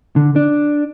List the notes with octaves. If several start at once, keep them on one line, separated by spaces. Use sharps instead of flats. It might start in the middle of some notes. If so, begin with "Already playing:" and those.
D3
D4